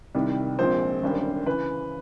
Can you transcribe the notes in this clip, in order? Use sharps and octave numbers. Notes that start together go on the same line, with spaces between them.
C2 C3 D#3 G3
A#1 A#2 F3 G#3 C4 C5
G#1 F#2 D3 G3
C#3 E3 B4